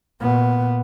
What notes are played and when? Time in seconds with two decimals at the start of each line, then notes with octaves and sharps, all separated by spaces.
0.20 A#2 B3